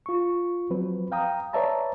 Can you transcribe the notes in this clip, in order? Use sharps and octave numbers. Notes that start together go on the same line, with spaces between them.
F4 C#6
F3 F#3 C4 B4
F5 G5 A#5 D#6
B4 C#5 D5 E5 A5 A#5